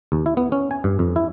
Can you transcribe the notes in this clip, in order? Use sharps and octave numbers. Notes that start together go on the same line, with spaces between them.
D#2
E4
B3
C#4
G#5
G2
F2
E4